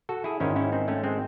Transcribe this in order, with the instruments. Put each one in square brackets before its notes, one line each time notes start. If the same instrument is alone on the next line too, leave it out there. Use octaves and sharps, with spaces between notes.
[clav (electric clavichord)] F#4 A4
E4 G#4
G#1 G#2 D#3 C#4 E4
C#4 E4
C4 D#4
A3 C#4
G#3 C4